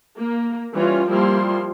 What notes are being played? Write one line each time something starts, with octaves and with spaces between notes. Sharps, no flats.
A#3
E3 G3 C#4 F4
F3 G3 A#3 E4 C6